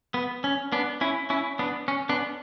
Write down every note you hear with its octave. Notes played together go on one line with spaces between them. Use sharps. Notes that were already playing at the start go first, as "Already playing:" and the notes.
B3
C#4
B3 D4
C#4 E4
C#4 E4
B3 D4
C#4
B3 D4